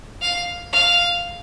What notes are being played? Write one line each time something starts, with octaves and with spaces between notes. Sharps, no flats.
F5
F5